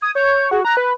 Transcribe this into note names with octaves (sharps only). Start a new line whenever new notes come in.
D#6 G#6
C#5 G6
F#4 G#4
A#5 F#6
B4